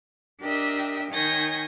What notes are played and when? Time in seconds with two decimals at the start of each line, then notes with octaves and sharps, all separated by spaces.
0.41 D4 G4 A#4 D#5 E5
1.11 D#3 C#5 G#5 G6 A#6